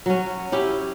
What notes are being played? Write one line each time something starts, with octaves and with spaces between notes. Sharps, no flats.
F#3 C#4
C#4 E4 G4